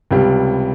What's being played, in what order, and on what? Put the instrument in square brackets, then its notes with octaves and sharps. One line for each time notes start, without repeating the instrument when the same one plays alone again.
[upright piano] C#2 C3 G3